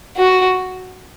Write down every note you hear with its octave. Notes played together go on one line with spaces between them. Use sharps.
F#4